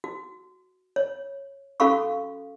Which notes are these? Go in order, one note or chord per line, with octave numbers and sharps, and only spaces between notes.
F#4
C#5
C#4 F#4 A4 F5 B5 C#6